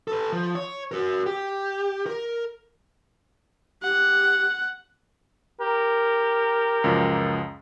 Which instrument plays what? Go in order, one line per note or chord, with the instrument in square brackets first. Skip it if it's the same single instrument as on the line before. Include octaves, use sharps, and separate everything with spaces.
[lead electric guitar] A4 B4
F3
C#5
F#4 A#4
G4
A#4
[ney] G4 [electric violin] F#5
[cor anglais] G4 [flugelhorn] A#4
[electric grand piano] C#2 F#2 F3